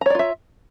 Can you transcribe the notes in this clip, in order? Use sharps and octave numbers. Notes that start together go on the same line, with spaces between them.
F4 C#5 D5 E5 A#5